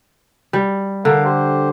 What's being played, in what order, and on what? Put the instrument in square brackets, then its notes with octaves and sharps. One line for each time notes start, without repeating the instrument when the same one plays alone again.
[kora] G3
[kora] D3 [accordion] A#4 F5
[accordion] G4 C5